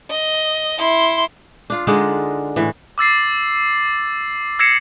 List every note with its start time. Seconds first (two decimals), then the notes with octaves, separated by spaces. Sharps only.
0.10 D#5
0.79 E4 C6
1.70 D4 F4
1.87 D3 G#3 D4 D#4
2.56 A2 E3
2.98 D6 E6 A6 C7
4.59 E6 G#6 A#6 C7 C#7 E7